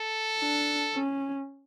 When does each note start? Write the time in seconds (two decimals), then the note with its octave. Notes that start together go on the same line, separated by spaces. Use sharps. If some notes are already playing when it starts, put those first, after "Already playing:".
Already playing: A4
0.39 D4
0.94 C#4